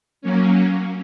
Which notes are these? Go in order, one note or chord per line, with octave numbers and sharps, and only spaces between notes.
F#3 A#3 C#4